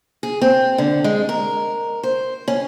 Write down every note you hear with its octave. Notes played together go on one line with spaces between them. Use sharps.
G#4
C4
D3
G#3
A#4
C5
C#4